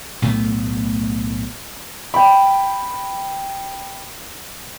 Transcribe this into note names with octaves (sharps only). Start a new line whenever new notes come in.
B1 A2 A3 B3
G5 B5